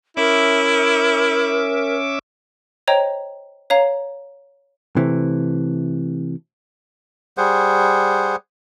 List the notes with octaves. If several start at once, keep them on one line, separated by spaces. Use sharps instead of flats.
C#4 E4 A#4 E5 D6
C5 C#5 D#5 G5 A#5
C#5 F5 A#5
C3 E3 A3
G3 G#4 C5 F#5